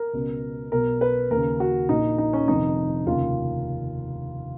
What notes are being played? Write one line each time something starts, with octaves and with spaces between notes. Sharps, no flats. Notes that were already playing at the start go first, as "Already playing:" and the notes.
Already playing: A#4
C#2 B2
B1 B2 A#4
B4
D#2 C#3 A#4
F#4
A#1 A#2 D#4
D#4
C#4
F1 F2 D#3 D#4
F1 D#2 C#3 F4